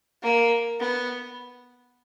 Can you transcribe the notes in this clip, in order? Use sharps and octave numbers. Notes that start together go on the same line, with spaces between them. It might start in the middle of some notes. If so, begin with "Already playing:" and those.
A#3
B3